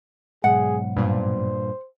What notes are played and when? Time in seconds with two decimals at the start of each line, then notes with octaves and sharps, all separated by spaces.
0.44 B1 G#2 G#4 F#5
0.97 G2 A#2 C5